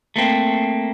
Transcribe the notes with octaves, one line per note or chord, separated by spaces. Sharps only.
A3 A#3 C4